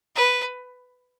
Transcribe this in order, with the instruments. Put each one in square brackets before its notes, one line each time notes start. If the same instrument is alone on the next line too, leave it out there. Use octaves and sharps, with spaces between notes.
[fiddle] B4